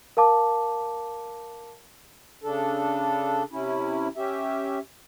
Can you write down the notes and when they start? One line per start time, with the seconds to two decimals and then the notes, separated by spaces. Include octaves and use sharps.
0.17 A#4 F5 A5 D6
2.42 C#3 D4 A4
3.52 C3 C#4 E4
4.17 C#4 G4 E5